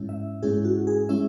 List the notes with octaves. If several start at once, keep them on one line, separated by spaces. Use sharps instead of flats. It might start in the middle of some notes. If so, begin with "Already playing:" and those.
Already playing: G#2 G#3 C#4 E4
E5
G#2 G#3 C#4 E4 G#4
F#4
G#4
G#3 C#4 E4 E5